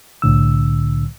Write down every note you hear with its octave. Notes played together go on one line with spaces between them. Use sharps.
C2 A2 D3 E6